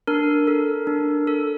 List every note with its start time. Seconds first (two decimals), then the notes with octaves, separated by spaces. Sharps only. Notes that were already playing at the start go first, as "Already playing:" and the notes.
0.07 D4 A#4
0.47 A4
0.87 D4
1.27 A4